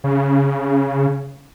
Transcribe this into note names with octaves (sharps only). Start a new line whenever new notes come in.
C#3